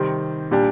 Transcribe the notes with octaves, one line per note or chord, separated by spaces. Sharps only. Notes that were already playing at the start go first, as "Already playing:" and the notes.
Already playing: C3 D#3 G3 C4
A#2 G3 D4 G4